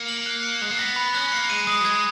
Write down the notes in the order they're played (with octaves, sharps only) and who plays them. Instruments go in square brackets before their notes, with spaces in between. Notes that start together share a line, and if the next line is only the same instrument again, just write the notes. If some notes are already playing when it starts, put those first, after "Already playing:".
Already playing: [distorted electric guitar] A#3 [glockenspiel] C#7
[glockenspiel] F#7
F#6
C#7
[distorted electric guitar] G#3 [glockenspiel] F#6
[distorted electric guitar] A#3
[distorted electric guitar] B3 [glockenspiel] A#6
[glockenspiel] B5
[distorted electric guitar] C#4 [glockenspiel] F#6
[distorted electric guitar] A#3 [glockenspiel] C#7
[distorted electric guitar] G#3 [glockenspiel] D#7
[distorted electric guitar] G#3 [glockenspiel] D#6
[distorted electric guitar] F#3
[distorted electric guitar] G#3 [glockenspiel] G#6